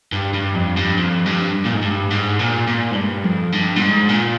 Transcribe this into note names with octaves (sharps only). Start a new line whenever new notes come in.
G2
G2
F2
G2
F2
G2
A#2
G#2
G2
G#2
A#2
A#2
G#2
G2
F2
G2
A#2
G#2
A#2